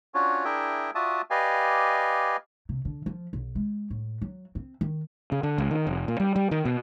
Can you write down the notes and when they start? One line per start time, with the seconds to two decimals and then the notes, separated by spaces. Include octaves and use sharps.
0.14 C#4 D4 F4 F#4 C#5
0.45 D4 E4 G#4 A#4 E5 G5
0.95 F4 F#4 D5 E5 A5 D#6
1.30 G4 B4 D5 D#5 F5 G#5
2.69 C3
2.85 D3
3.06 F3
3.33 B1
3.55 G#3
3.90 A2
4.22 F#3
4.55 C4
4.81 D#3
5.32 C#3
5.43 D3
5.58 C#2
5.71 D#3
5.87 F1
6.08 A#2
6.20 G3
6.36 G3
6.51 D#3
6.65 B2